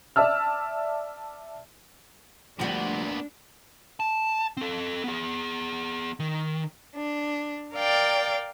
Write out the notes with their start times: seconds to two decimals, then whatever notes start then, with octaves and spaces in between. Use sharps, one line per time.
0.16 D5 E5 A5 E6 F6
2.60 D2 A#2 F3 G3 A3 B3 D4 F#4
4.00 A5
4.57 C4 A4
5.04 B3 G#4
6.20 D#3
6.96 D4
7.75 A#4 D5 F5 G5 A6